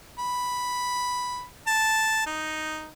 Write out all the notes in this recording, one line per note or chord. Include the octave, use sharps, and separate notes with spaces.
B5
A5
D#4